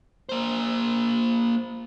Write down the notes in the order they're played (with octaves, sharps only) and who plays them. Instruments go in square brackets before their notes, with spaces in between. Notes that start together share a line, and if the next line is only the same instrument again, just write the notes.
[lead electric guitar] A#3 C5